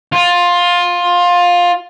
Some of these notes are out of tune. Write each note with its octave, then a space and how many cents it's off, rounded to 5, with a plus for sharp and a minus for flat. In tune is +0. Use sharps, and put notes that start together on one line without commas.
F4 +15